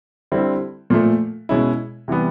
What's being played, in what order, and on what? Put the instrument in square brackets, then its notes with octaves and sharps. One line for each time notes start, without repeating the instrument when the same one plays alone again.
[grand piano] D3 G3 C4 E4
A#2 F3 A3
B2 G#3 C#4 E4
C3 E3 G3 B3